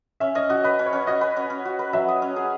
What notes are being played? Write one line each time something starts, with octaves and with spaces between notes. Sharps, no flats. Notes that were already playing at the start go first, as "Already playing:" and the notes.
C#4 E5
C#4 D#5
F#4 D#5
B4 D#5
C#4
C#5
C#4
F#4 D#5
B4
C#4
C#4
F#4
B4
F#3 E5
D#5
C#4
G#4